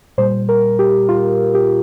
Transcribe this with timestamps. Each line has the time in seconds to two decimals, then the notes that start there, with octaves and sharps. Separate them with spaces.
0.18 A#2 G3 C5
0.49 A#4
0.79 G4
1.09 F4
1.55 G4